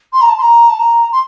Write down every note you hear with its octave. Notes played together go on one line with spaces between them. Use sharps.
C6
A#5
A5
C6
A#5
A5
A#5
C6